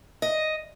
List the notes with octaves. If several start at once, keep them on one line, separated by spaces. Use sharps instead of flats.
D#5